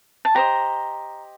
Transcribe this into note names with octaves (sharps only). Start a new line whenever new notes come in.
A5
G4 C5 D#5 A#5